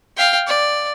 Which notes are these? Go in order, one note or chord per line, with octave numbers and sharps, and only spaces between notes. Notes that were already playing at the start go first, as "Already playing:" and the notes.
F5 G5
D5